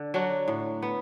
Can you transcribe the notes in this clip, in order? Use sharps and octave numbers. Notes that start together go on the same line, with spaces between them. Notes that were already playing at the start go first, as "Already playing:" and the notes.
Already playing: D3
F#3 D4 F#4
A2
B3